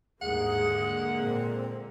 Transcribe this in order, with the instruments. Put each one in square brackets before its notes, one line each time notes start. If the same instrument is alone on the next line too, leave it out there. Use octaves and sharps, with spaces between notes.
[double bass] D#2 G#2 [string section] D3 G#3 A#3 [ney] G#4 [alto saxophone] F#5
[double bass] A#2 [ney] C4